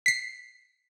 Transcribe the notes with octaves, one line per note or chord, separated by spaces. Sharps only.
B6 C7